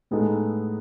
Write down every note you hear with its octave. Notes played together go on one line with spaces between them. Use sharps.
A2 G#3 B3 D#4 A4